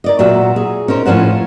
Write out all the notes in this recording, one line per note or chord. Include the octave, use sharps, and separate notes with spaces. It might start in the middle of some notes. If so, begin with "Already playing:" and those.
A#4 D5 D#5
A#2 F#3 F#4 E5
G#4
C#4 D#4 A#4 C5
A2 F3 C#4 C5 F#5